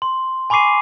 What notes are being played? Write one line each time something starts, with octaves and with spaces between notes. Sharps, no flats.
C6
G#5 B5 C#6 D6 C7 D#7